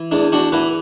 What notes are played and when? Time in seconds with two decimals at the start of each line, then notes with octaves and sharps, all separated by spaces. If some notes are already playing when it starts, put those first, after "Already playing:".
Already playing: E3
0.11 E2 D4
0.32 D4 F#4
0.52 E3 F#4 B4